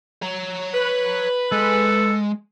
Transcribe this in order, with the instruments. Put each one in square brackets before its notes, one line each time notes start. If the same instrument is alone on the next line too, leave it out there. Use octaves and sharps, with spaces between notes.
[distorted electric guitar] C#5 A#5
[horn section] B4
[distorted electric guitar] G#3 [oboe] A4